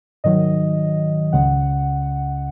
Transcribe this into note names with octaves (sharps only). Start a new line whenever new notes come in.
G#2 D#3 F#3 D#5
C#2 C#3 G#3 F#5